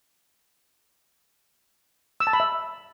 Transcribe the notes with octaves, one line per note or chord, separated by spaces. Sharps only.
E6
A5
B5
E5